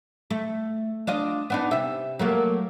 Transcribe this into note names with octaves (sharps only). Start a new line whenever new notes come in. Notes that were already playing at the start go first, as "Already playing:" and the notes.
A3
D4 F4 D#5
B3 D4 D#4
C3 E5
F#3 A3 A#3